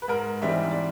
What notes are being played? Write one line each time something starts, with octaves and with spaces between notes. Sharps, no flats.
B4
G#2 A#4
E3 G3 C4 D#4 E5
D5